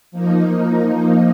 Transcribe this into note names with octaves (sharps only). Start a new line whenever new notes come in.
F3 A#3 D#4